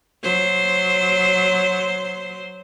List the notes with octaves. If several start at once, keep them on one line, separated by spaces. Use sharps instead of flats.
F#3 C5